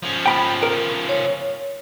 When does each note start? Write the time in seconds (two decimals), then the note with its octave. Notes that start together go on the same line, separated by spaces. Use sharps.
0.03 F3 C#4
0.26 G5 B5
0.63 A#4
1.09 C#5